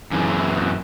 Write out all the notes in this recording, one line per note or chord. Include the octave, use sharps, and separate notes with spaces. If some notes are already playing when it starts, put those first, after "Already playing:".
F#2 E3